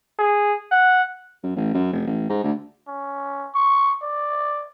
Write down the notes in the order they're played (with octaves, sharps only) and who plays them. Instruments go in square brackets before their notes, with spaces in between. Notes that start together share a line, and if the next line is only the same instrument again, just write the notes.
[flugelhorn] G#4
F#5
[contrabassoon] F#2
A1
F#2
F1
A1
G#2
D2
[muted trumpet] C#4
C#6
D5